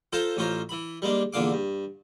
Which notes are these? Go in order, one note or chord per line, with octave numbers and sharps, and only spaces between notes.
F4 A4 C5 F5 A5 A#5
A1 C#4 F4 C5 A#5
E3 B5
G3 G#3 A#3 D4
E2 A#2 D3 F5 D6
G2